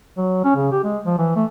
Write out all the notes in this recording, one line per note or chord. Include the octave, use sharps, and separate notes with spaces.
F#3
C#4
C#3
G4
G#3
F3
E3
A3